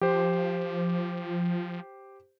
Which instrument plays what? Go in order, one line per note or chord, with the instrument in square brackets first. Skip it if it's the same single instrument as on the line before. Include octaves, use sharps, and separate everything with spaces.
[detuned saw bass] F3 [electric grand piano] G4 C5